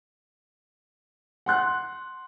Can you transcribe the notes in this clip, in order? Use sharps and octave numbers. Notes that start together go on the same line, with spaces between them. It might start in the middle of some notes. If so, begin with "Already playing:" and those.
F#5 C6 F#6